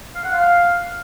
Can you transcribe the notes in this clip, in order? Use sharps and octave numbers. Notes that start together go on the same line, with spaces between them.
F5
F#5
F5